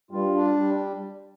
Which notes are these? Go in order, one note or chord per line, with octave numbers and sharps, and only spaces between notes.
G2 G3 F4
D4
G3